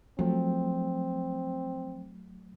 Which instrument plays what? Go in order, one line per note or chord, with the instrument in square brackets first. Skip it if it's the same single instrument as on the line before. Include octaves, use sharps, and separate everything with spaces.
[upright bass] F3 [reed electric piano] F#3 A3 [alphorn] C4